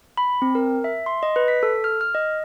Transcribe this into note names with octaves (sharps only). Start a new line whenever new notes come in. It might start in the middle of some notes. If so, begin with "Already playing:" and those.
B5
C4
A#4
E5
C6
D#5
B4
B6
A4
F6
F6
D#5